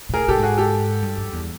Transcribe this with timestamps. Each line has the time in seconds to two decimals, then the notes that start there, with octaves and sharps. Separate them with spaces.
0.09 A#2
0.13 A2 G#4 A#4
0.28 A2 G4 A4
0.36 G#2
0.43 F#4 G#4
0.58 G4 A4
1.02 G2
1.17 F2
1.33 E2